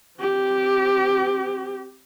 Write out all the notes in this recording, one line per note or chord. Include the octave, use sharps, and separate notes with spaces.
C4 G4